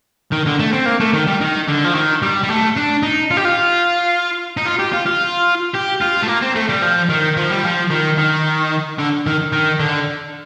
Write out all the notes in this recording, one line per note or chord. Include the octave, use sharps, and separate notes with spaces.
D#3
D3
A3
C4
A#3
A3
D#3
G3
D#3
D3
F3
D#3
G3
G3
A3
D4
D#4
F4
G4
F4
D#4
F4
G4
F4
F4
G4
F4
A3
A#3
C4
A3
G3
F3
D#3
F3
G3
F3
D#3
D#3
D3
D#3
D#3
D3